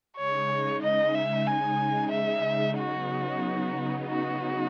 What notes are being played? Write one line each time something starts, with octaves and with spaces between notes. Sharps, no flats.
C#3 G#3 D#4 C#5
D#5
E5
G#5
E5
C#3 F#3 B3 D#4 F#4
F#4